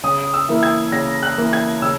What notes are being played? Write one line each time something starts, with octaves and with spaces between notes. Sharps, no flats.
C#3 D#6
E6
E3 A#3 E4
G#6
C#3 A#6
F#6
E3 A#3 E4
G#6
C#3 E6